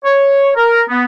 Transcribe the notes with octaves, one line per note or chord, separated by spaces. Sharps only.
C#5
A#4
B3